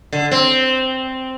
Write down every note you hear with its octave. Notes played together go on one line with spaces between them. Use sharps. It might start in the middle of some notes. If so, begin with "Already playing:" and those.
D3
C4